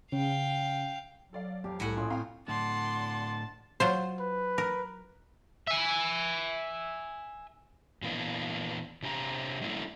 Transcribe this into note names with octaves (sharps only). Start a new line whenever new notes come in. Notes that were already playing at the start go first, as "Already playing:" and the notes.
C#3 F5 G5
F#3 A4 D5 F5
F2 G4 F5 A#5
C2 A2 A4 F#5 G#5
A#1 C#4 F4 D#6
C4 F5 G5 A#5
A2 D3 D5 F#5 A5 C6
F#3 F4 C5
B4
A#4
E5 G#5
A#2 E3 A#3 B3 D4
C3 D4 G4 A5 A#5
G3 A3 A#3 C#4 D4 E4